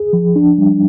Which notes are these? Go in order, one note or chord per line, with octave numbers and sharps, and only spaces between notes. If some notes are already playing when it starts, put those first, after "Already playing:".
Already playing: G#4
F3
D4
G3